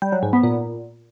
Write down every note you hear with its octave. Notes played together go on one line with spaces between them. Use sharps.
G3
F#3
G#2
B3
A#2